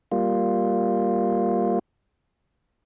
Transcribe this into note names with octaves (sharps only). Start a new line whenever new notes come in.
G3 A#3 F4